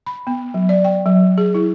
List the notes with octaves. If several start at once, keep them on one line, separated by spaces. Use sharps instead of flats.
B5
B3
F#3
D5
G5
F#3
G#4
E4